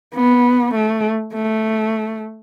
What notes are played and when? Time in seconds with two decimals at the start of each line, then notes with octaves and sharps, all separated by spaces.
0.15 B3
0.75 A3
1.34 A3